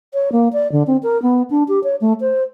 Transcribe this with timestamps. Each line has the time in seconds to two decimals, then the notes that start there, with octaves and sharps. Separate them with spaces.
0.13 C#5
0.32 A#3
0.53 D5
0.72 D3
0.87 C4
1.03 A#4
1.22 B3
1.50 D4
1.68 G4
1.84 C#5
2.01 A3
2.20 C5